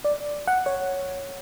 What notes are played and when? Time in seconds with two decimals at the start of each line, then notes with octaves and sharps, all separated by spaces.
0.04 D5
0.47 F#5
0.66 C#5